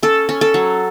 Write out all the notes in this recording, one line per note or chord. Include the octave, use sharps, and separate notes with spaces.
C#4 A4
C#4
A4
F#3